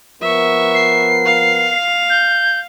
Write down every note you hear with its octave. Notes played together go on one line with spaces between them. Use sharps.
F3 B3 A#4 E5 C#6
C7
F5
G6